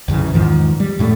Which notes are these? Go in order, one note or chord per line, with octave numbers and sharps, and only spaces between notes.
C2 F#2 C#3 E3
E2 G#2 D#3 F3
G3
F#2 A2 G#3 A3